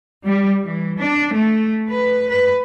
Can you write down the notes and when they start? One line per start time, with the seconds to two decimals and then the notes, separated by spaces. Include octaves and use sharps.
0.25 G3
0.62 E3
0.99 D4
1.34 A3
1.90 B4
2.30 B4